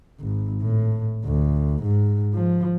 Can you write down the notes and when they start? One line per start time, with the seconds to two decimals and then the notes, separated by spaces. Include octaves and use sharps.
0.20 G#1
0.62 A2
1.25 D2
1.83 G#2
2.34 F3